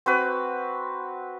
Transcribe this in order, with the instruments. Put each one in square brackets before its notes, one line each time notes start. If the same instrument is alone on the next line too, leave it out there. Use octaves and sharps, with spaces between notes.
[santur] C4 F#4 B4